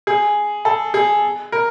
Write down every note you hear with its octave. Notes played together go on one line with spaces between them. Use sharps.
G#4
A4
G#4
A#4